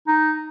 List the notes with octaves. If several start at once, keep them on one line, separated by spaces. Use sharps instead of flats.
D#4